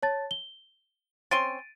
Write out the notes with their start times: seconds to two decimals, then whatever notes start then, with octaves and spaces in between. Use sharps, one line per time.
0.03 C#5 A5 A6
0.31 G7
1.31 C4 C#4 C6 A6 D7 D#7